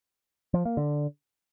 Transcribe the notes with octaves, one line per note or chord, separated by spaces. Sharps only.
F3
A#3
D3